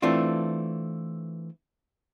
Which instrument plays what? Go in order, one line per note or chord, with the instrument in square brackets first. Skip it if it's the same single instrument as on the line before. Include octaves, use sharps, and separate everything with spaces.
[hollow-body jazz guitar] E3 A3 C4 D4 F4